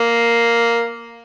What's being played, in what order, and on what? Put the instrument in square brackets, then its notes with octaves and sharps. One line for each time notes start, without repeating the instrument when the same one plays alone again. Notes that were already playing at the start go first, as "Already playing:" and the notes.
Already playing: [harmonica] A#3